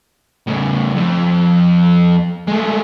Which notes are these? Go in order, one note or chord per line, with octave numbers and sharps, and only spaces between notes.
A2 C#3
F2
G#3 A3